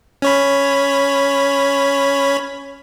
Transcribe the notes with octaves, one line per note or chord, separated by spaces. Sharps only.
C#4 C#5 B5